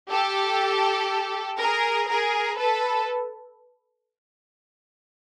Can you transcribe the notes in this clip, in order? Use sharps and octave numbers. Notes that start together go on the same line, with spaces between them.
G4 A4
G#4 A#4
G#4 A#4
A4 B4